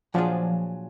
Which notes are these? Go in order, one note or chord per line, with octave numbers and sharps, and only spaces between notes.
A#2 F3 F#3 D4 F4 G#4